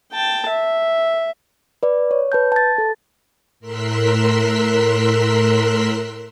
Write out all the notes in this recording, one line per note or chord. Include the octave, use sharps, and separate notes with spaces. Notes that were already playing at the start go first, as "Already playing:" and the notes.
G5 A5
E5
B4 D5
C#5
B4 A5 G6
A5 A6
A4
A2 A#4 C6 E6 F#6 B6